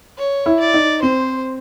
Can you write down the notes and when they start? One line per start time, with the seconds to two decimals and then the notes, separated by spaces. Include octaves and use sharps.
0.18 C#5
0.46 E4
0.60 D5
0.74 D#4
1.02 C4 C5